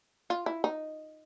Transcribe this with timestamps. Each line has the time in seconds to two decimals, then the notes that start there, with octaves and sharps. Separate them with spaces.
0.30 F4
0.46 E4
0.64 D#4